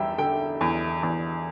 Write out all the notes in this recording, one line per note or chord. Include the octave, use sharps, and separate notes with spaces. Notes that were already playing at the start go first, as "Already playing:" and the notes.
Already playing: E2 G3 E5 G5
D3 G5
E2
E2